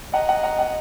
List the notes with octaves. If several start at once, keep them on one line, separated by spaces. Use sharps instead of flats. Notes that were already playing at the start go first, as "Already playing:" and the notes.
D#5 F#5 A#5
F#5 A#5
F#5 A#5
F#5